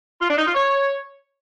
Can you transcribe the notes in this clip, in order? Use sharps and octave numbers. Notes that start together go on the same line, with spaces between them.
F4
D4
D#4
F4
C#5